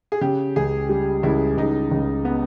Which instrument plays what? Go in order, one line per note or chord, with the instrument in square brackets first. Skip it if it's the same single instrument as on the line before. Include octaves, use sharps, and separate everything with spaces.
[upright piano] G#4
[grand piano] C#3 [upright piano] G4
[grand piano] C#2 [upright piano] G#4
[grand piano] G3
[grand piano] C#2 [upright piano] E4
[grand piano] C#2 [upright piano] D#4
[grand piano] C#2
[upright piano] B3